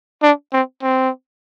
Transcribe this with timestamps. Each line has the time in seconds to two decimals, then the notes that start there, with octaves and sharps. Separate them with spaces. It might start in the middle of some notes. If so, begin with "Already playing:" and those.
0.23 D4
0.53 C4
0.82 C4